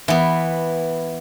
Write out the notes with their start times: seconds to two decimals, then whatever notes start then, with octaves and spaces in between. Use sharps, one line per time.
0.08 E3 B3